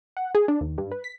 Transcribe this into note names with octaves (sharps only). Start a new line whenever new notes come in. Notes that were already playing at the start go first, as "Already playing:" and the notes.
F#5
G#4
D4
D#2
G2
B4
B6